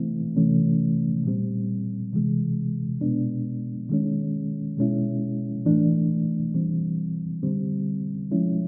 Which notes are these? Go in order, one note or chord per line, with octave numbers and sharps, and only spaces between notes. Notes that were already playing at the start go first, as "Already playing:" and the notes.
Already playing: C3 E3 A3 C4 E4
C3 E3 A3 C#4
A#2 G3 C4
C3 E3 G#3
B2 G#3 B3 D4
D#3 G#3 C#4
B2 G#3 C#4 E4
A2 E3 A3 D4
E3 G3 C4
D3 G3 C4
F3 G#3 C#4 E4